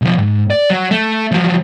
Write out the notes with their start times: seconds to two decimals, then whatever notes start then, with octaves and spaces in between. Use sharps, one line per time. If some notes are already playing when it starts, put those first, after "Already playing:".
0.02 B1 F3
0.18 G#2
0.50 D5
0.70 F#3
0.91 A3
1.32 F3 F#3